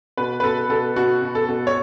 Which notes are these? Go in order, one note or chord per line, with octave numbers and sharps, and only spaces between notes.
B2 B4
B4
B2 A4
B2 A4
B2 F#4
B2
A4
B2
C#5